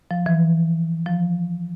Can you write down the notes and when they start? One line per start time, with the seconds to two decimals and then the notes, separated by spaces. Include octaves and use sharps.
0.11 F3
0.26 E3
1.06 F3